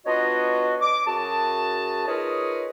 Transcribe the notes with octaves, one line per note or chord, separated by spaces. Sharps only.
B3 D4 F4 F#4 C#5 D#5
D6
F#2 F#4 G#4 A5
D#4 F4 G#4 A#4 B4 C#5